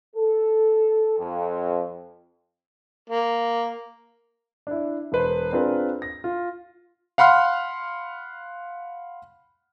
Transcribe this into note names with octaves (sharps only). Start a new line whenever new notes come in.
A4
F2
A#3
D4 E4
E1 B4 C5
C4 D4 F4 G#4 A#4 B4
A#6
F4
F5 F#5 B5 C6 F6